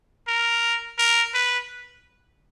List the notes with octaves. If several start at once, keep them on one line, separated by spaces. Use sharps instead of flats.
A#4
A#4
B4